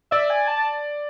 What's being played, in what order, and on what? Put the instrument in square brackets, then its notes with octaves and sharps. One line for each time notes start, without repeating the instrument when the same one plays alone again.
[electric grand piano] D5 [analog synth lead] E5
[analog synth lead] G#5
A5